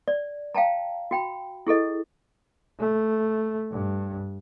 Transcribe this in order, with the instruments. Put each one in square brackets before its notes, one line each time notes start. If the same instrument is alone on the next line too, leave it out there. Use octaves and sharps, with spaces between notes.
[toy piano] D5
F5 G5 A5 A#5
F#4 G5 B5
E4 G#4 A4 D#5
[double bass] A3
G2